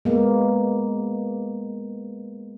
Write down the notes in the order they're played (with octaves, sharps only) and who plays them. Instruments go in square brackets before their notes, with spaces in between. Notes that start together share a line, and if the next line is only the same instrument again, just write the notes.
[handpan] G#3 A#3 B3